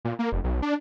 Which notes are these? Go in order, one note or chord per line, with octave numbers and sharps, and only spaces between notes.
A#2
A#3
F1
B1
D4